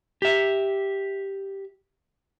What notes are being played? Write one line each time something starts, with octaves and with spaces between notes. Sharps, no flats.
G4 E5